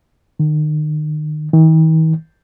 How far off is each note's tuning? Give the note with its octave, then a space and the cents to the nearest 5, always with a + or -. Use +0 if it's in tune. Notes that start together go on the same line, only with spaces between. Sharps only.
D#3 -35
D#3 +45